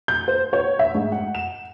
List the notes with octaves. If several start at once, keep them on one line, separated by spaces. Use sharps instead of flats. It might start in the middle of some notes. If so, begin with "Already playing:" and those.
G6
C5
C#5
E5
G#2
F#5
E7